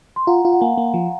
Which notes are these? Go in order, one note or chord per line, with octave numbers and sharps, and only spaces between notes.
C6
F4 F#5 A#5
F4
F#5
A#3 F5 G#5
A#3
F3